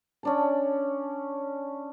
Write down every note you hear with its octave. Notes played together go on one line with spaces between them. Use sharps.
C#4 D4 A5